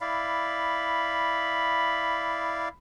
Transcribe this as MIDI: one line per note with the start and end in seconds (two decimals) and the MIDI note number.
0.01 2.69 64
0.01 2.69 74
0.01 2.69 77
0.01 2.75 83